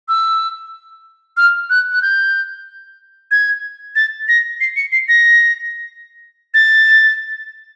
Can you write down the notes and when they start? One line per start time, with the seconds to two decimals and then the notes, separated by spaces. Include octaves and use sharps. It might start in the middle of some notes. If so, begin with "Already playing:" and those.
0.08 E6
1.37 F6
1.70 F#6
1.92 F#6
2.02 G6
3.31 G#6
3.96 A6
4.28 A#6
4.61 C7
4.76 C#7
4.92 C7
5.08 A#6
6.54 A6